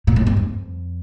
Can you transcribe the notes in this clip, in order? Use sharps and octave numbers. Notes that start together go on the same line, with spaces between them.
A#2
A2
G2
F2